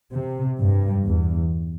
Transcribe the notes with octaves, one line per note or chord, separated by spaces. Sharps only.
C3
G2
E2